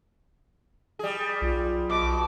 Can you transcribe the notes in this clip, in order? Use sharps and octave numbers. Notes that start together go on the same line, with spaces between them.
G3 G#4
B1 F4
B2 D6